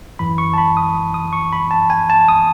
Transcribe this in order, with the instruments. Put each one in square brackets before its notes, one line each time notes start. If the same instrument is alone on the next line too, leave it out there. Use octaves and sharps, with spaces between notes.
[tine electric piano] F#2 E3 B5
C#6
A5
B5
D#6
D#6
C#6
B5
A5
G#5
A5
D#6